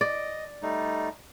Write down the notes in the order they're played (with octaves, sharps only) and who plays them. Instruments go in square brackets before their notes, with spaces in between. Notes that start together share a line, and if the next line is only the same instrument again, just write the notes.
[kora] D5 [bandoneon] D#5
[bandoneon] G3 A3 D#4